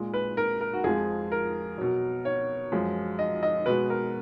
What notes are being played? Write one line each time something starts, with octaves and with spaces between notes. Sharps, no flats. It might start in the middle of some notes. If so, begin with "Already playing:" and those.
Already playing: A#2 G#3
B4
A#4
A#4
F#4
F2 F3 G#3 G#4
A#4
B2 F#3
C#5
F#2 F3 G#3
D#5
D#5
B2 G#3 B4
A#4